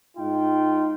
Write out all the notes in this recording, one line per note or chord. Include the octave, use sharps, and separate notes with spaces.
G#2 D#4 F4 G5